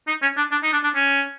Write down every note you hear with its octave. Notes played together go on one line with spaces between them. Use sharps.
D#4
C#4
D4
D4
D#4
D4
D4
C#4